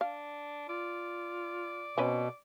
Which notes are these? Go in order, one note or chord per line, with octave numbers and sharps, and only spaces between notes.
D4 F5
F4 D5
B2 C4 C#4 B4